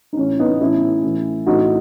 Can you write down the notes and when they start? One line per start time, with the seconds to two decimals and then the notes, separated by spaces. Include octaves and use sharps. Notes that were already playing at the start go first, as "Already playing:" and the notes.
0.13 D#4
0.17 A2 E3 C#4
0.39 B3 D#4
0.60 A2 E3 C#4 E4
1.03 A2 E3
1.46 A2 E3 D#4 F#4